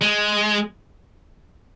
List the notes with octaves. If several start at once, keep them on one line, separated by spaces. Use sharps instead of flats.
G#3